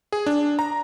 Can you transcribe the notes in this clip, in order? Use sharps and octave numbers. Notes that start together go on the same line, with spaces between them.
G#4
D4
A#5